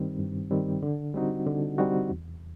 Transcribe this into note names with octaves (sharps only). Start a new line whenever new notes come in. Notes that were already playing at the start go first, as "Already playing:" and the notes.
Already playing: G2 D#3 G3 C4
G2
D#3 G3 C4
D3
G3 C4 D#4 F#4
D3
G3 C4 D#4 F#4
E2